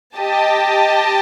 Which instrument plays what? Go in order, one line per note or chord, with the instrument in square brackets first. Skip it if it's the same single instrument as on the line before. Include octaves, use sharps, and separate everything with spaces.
[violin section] G4 D#5 A5